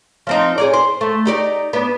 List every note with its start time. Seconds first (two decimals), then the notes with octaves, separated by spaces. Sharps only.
0.27 F3 C4 D#4
0.58 G#4 C#5 D5
0.74 C5
1.01 A3
1.25 D#4 G4 D5
1.73 B3 D4